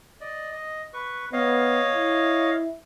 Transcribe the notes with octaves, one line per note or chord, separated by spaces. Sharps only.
D5 D#5
D#5
B4 C#6
B3 C#5 D#5 F5
E4